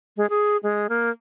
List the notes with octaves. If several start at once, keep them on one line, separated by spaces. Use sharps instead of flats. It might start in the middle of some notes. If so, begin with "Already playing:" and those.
G#3
G#4
G#3
A#3